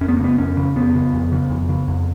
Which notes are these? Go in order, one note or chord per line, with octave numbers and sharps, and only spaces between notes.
F2 C#4
B3
A#3
C#3 B3
F2 C#4
C#3
F2 B3
C#3
F2
C#3
F2
C#3
F2